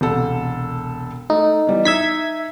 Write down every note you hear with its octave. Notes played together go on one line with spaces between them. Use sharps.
E1 C2 A4
A3 D#4
E3 G3 B3
D#4 E5 G#6 B6